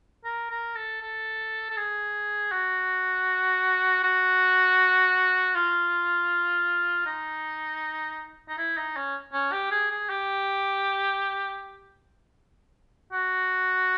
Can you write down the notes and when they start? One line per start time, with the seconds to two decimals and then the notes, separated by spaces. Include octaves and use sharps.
0.25 A#4
0.50 A#4
0.76 A4
1.01 A4
1.70 A4
1.77 G#4
2.52 F#4
4.03 F#4
5.55 F4
7.06 D#4
8.49 D#4
8.58 E4
8.77 D#4
8.96 C#4
9.33 C#4
9.52 G4
9.71 G#4
9.91 G#4
10.09 G4
13.13 F#4